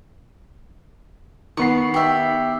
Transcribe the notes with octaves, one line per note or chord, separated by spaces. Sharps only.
D#3 B3 C#6 C7
G4 E5